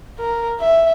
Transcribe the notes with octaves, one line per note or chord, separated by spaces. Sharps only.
A#4
E5